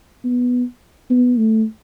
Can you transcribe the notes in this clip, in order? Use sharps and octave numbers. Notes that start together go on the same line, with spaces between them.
B3
B3
A3